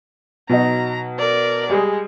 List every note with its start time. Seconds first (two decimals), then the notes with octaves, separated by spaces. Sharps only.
0.49 B2 F#3 D#4 A#5
1.19 A#4 D5
1.70 G3 G#3 G#4